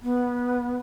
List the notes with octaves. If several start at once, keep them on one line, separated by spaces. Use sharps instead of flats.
B3